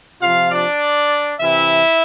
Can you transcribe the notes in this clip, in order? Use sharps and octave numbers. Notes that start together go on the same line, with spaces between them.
C3 F3 F4 F5
D4 D5
C3 E3 E4 E5